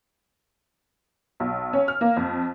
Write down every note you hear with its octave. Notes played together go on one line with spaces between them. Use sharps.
B1
C#4
F6
A#3
F2